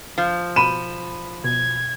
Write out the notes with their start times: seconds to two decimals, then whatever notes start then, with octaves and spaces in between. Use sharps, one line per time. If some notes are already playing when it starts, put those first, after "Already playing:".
0.18 F3
0.56 B2 B5 D#7 E7
1.44 B2 G#6